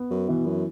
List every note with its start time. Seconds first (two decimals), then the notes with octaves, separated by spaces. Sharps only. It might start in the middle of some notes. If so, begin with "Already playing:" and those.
Already playing: B3
0.10 F#2
0.28 B2 E3
0.46 F#2